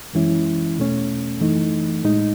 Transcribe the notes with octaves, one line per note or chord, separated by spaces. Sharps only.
F#2 E3 G#3 C#4 E4
E2 B2 A3 C#4
F#2 E3 A3 D#4
A2 G#3 D#4